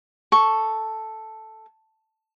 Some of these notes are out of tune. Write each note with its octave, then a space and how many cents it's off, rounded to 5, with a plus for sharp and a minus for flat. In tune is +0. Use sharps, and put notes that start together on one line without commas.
A4 +0 C#6 +0